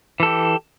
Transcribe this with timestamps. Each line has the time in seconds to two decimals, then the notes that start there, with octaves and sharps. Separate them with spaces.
0.20 E3
0.23 A4
0.26 G4